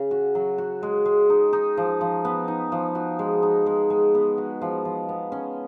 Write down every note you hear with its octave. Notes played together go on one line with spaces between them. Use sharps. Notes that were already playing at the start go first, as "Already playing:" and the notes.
Already playing: C#3 C#4
F#4
F#3
F#4
G#3
G#3
D#4
D#4
F3
F3
B3
D#4
F3
F#4
G#3
D#4
G#3
G#3
B3
F#4
F3
F3
B3
C#4